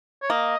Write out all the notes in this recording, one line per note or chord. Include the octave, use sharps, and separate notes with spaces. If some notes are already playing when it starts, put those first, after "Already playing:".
C#5
A#3 D#5